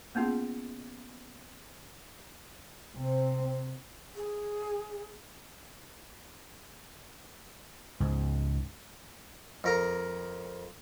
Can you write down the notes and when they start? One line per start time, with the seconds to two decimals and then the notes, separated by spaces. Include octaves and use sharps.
0.15 A#3 B3 C#4 F4 G#4
2.95 C3 C4
4.16 G#4
8.00 C#2 G#2
9.64 F2 A#4 A#5